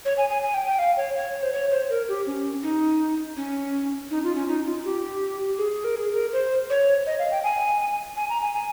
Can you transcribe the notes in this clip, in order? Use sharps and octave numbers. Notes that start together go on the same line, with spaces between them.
C#5
G#5
G#5
G#5
G5
G5
F5
C#5
C#5
C5
C#5
C5
A#4
G4
C#4
D#4
C#4
D#4
F4
C#4
D#4
F4
G4
G#4
A#4
G#4
A#4
C5
C#5
D#5
F5
G5
G#5
G#5
A#5
G#5
G#5